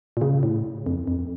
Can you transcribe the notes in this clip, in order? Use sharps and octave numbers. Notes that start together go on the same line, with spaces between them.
A#2
C#3
A2
F2
F2